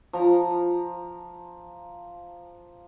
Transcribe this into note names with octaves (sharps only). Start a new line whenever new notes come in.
F3 A#5